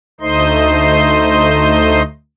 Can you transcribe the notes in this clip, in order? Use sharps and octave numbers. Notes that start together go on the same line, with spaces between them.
D2 A3 D#4 C5 D#5 C6